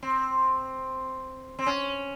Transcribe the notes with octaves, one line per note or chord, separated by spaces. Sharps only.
C4
C4
C#4